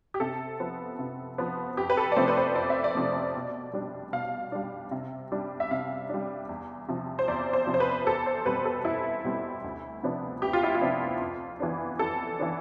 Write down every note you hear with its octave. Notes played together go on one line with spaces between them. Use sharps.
G4
C3 A4
F3 B3
C3
F3 B3
F2 G4
B4
A4
D5
C3 F3 A3 C5
B4
C5
F2 D5
E5
D5
C3 F3 A3
B2
G3 D4
B2 F5
G3 D4
C3
G3 D4
E5
C3 F5
G3 D4
E2
C3 F3
C5
E2 D5
C5
C3 F3
C5
B4
E2 A4
C5
B2 G3 C4 B4
A4
E2 E4
B2 G3 C4
D2
C3 F3 B3 D4
D2 G4
F4
E4
F4
C3 F3 B3 D4
F2
E3 B3 D4
F2 A4
E3 B3 D4